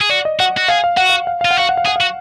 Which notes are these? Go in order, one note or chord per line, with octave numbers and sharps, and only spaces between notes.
G#4
F#4 D5
D#5
F#4 F#5
F#4
G#4 F5
F5
F#4 F#5
F5
F5
F4 F5
F#5
F#4 F5
F#5
F5
G#4 F#5
F#4 F5